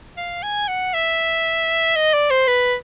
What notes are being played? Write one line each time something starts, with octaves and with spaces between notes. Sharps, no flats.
F5
G#5
F#5
E5
D#5
D5
C5
B4